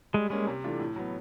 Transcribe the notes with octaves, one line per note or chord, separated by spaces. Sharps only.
G3 G#3
G#3 A#3 C#4
C3
E3 A3 D4 F4
A2
F#3 B3